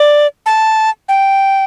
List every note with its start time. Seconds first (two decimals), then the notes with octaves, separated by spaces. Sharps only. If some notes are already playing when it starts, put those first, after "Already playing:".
Already playing: D5
0.46 A5
1.09 G5